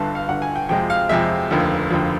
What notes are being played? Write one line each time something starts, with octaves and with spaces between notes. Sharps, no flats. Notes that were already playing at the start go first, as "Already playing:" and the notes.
Already playing: G1 G2 D3 A5
F5
G1 G2 D3 F#5
G#5
G5
F2 C3 F3 G#3 G5
F5
F2 C3 F3 G#3 E5
F1 D#2 D3 F3
F1 D#2 D3 F3